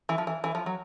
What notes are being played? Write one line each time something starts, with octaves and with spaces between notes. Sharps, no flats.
E3
F3
E3
E3
F3
F#3